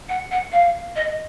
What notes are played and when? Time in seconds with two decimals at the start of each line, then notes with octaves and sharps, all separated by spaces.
0.09 F#5
0.31 F#5
0.52 F5
0.96 D#5